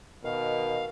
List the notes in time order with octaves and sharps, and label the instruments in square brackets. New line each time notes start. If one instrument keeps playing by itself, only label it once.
[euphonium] B2 [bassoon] D#3 [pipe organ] F5